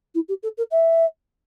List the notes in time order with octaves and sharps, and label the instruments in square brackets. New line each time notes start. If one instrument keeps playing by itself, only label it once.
[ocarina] E4
G4
A4
A#4
E5